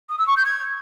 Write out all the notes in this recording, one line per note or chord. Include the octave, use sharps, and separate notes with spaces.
D#6
E6
C#6
G6
G#6